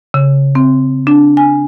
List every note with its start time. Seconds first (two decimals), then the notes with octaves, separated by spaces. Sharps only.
0.14 C#3
0.55 C4
1.07 D4
1.37 G#5